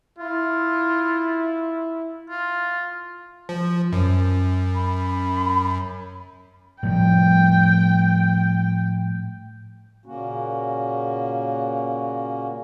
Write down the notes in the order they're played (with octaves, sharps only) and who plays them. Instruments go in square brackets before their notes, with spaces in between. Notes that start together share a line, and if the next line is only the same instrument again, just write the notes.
[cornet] E4 [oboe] F4
[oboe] F4
[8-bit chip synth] F3
F#2
[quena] B5
[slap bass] A2 F3 G3 [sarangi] G5
[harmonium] A#2 C#3 A#3 C#4 F#4